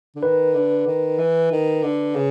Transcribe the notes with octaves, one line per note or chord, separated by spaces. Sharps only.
D3
D#3 B4
D3
D#3
E3
D#3
D3
C#3